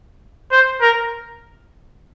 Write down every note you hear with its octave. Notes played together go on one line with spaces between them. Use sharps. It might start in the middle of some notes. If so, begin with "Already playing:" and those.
C5
A#4